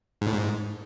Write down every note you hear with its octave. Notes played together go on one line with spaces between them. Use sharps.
G#2
A2
G#2